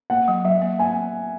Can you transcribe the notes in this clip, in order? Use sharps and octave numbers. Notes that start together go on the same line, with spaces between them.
A#3 F#5
F#3
F#3 E5
A#3
A#3 G#5